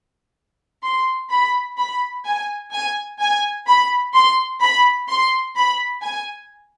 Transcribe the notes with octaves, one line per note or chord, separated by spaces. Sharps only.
C6
B5
B5
G#5
G#5
G#5
B5
C6
B5
C6
B5
G#5